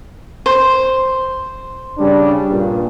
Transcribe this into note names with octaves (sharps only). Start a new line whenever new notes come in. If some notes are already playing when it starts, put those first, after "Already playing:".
C5
C#3 G3 D4
G2 A#2